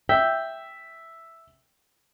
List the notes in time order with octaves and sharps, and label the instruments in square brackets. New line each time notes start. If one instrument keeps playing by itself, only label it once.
[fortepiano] E5 [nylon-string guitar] G5